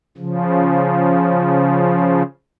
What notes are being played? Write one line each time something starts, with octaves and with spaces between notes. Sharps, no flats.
C#3 F3